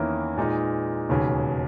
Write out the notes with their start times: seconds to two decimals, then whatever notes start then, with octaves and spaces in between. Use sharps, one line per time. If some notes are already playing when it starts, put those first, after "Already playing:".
Already playing: E2 D#3 A#3 C#4 E4
0.38 A#2 G#3 D#4
1.09 E1 D#2 C#3